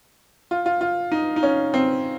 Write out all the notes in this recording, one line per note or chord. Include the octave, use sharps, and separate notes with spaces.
F4
F4
F4
D#4
D#4
C#4
C4